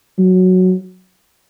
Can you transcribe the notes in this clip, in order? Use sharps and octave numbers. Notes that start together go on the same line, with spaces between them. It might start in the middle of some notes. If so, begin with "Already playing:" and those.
F#3